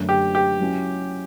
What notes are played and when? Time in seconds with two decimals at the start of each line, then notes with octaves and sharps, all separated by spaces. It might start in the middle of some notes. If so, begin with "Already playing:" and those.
Already playing: F#2 D3 A3
0.09 G4
0.35 G4
0.60 F#3 C#4 E4